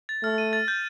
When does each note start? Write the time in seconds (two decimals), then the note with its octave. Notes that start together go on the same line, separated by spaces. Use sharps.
0.09 A6
0.23 A3 F6
0.38 D#7
0.53 A6
0.68 G6